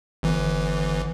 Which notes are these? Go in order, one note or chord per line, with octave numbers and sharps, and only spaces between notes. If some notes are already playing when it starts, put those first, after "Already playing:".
G1 E3